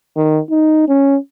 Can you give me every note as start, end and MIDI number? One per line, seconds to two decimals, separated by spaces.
0.16 0.40 51
0.51 0.86 63
0.88 1.17 61